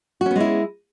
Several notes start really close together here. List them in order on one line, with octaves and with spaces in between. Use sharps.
F#4 C#4 B3 G#3 E4